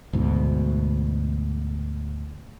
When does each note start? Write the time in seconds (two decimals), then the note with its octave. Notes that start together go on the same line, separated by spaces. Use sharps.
0.13 D2 G#2 B2